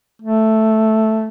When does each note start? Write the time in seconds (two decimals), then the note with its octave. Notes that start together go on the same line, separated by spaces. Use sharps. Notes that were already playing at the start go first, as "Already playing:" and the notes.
0.22 A3